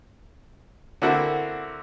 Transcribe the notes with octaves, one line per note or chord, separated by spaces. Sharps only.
D3 A#3 C4 E4 F#4